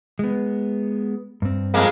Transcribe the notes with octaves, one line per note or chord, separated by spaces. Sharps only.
G#3 B3
G2 C4
F2 G#3 A#3